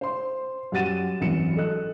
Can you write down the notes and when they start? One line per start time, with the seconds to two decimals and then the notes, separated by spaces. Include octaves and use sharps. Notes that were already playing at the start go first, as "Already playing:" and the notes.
0.01 C5 C6
0.72 F#2 G4 F#5 A6 D#7 E7
1.21 G#1 F#2 E3 C#7 E7
1.56 A4 D#5 F#6